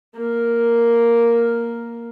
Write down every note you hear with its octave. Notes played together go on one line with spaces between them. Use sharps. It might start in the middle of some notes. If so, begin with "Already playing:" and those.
A#3 A#4